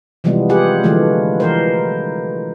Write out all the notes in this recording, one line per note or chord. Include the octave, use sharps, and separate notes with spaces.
C3 E3 F3 G3 G#3 B3
F4 G4 G#4 B4 F#5
D3 E3 F3 G#3 A3
E3 A#4 C5